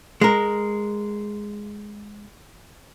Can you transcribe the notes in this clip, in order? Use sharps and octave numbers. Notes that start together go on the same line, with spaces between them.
G#3 A#4